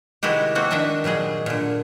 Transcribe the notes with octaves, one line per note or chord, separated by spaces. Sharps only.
C3 D#3 G#3 E4 F#4 G4
A#3 C4 F#4
D#3 D4 D#5 E5 A5
A#2 F#3 G3 G#4 D#5
A#2 D3